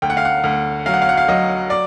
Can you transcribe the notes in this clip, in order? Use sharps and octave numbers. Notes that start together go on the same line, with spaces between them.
D2 G5
F#5
F5
F#5
D2
F#3 F5
F#5
F5
F#5
F5
F#3 D#5
D5